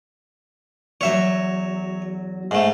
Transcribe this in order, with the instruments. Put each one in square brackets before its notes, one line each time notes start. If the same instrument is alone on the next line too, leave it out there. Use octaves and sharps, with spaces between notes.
[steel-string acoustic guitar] E2 F#3 [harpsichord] C#5 E5
[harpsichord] G#2 A3